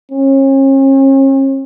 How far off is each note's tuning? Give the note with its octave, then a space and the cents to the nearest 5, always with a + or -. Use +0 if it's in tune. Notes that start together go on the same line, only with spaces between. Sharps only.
C#4 -40